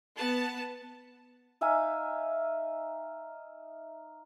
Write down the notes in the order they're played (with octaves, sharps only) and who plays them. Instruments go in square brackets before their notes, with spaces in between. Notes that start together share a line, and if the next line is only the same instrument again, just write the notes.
[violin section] B3 A5
[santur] D#4 E5 F5 G#5